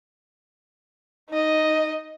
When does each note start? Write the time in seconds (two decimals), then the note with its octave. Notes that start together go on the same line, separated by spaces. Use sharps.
1.30 D#4 D#5